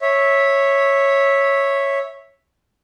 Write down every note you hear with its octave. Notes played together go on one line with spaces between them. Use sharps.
C#5 E5